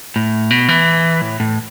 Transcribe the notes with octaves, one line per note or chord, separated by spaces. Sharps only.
A2
B2
E3
A2
A2